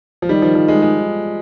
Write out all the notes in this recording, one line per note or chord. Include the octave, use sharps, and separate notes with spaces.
F3
D#3 G3
F3
F3
G#3
G#3